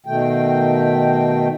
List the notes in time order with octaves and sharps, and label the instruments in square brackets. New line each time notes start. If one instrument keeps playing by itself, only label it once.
[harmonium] B2 D#3 A3 G5